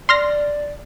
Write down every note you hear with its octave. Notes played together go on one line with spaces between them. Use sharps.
D5 C6 F6 A#6